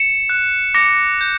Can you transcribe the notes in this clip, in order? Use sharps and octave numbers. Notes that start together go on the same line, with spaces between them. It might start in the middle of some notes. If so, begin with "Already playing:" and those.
Already playing: C#7 E7
F#6
D6 A#6 C#7
G6